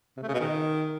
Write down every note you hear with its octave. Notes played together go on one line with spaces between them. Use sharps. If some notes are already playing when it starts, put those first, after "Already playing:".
C3
A3
C#3
B2
D#3